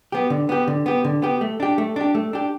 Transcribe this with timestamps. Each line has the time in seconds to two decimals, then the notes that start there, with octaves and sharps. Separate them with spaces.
0.12 B3 G4
0.30 D3
0.49 B3 G4
0.68 D3
0.86 B3 G4
1.05 D3
1.22 B3 G4
1.41 A3
1.60 D4 G4
1.78 A3
1.96 D4 G4
2.15 A3
2.33 D4 G4